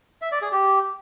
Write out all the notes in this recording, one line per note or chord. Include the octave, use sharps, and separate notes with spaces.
E5
D5
G#4
G4